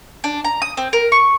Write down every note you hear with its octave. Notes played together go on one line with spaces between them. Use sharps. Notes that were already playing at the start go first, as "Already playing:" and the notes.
D4
A#5
D#6
C4
A#4
C#6